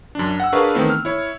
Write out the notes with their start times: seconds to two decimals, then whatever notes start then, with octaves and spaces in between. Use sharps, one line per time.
0.15 F#2 D4
0.40 F#5 E6
0.53 D4 G#4 A#4 B4 F5 C#6
0.75 D#3 E3 A3 B3 C4
0.90 F6
1.05 E4 C#5